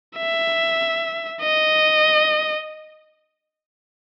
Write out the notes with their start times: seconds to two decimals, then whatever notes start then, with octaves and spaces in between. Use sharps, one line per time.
0.17 E5
1.41 D#5